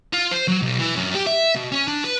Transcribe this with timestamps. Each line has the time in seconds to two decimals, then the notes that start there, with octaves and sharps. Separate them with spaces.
0.13 F4
0.31 C5
0.48 F#3
0.62 B1
0.79 E3
0.95 F#2
1.14 G4
1.27 E5
1.55 B2
1.72 C#4
1.88 D4
2.05 B4